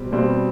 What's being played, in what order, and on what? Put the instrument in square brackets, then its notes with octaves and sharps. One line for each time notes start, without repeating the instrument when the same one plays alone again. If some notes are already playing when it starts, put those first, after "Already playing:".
Already playing: [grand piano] B2 G3 C4
B2 G3 C4